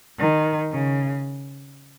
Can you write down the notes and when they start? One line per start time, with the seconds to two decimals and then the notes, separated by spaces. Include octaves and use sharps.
0.18 D#3
0.71 C#3